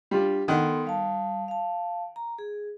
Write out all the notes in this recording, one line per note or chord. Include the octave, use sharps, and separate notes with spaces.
G3 D4 F4 G4
D#3 B3 A4 F#5 C6
G3 F5 A5
F5 A5
A#5
G#4